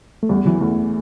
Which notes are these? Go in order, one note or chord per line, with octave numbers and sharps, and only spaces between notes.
A3
E2 G3
E3 F#3
E2 A3